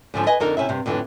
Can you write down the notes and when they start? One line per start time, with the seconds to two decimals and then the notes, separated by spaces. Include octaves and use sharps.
0.14 G#2 D3 F3 C#4
0.26 B4 D#5 G#5
0.40 F2 D3 D#4 A#4
0.57 C3 C#4 E4 E5
0.69 G2 C3
0.86 F2 A2 D3 E3